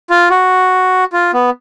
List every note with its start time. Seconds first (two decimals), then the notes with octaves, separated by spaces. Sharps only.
0.10 F4
0.30 F#4
1.13 F4
1.33 B3